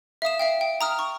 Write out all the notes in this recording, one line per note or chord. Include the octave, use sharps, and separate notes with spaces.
E5 F5 D#6 E7
E5 F5 G5
G5
A#5 D#6 F6
C#6